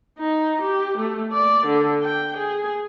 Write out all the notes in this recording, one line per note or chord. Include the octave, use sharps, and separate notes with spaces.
D#4
G4
A3
D5
D3
G5
G#4